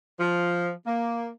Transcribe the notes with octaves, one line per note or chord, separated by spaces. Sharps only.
F3
A#3